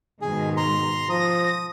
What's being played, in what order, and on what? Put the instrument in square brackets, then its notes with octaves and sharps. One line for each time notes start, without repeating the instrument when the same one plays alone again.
[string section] G#2 B2 D#3 [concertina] G#4
[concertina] A#5 C6
[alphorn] F3 [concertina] D#6 [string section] A#6